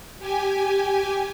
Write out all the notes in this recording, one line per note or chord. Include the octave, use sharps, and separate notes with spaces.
G4 G#5